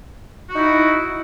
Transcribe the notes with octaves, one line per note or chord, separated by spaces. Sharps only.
D#4 E4 F#4